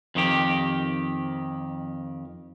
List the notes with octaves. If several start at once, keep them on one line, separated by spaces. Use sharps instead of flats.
F2 D#3 G4